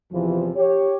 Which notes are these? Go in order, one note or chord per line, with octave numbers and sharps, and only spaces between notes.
E2 C3 E3 F3
G4 C#5